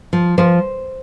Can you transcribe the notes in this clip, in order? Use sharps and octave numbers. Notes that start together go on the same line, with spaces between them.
F3
F3 C5